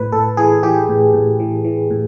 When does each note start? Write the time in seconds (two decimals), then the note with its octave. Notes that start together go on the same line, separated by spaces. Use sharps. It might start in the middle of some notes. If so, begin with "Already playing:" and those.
Already playing: A2 B4
0.12 A2 A4
0.37 E3 G#4
0.63 E3 G4
0.89 A2
1.14 A2
1.40 E3
1.64 E3
1.90 A2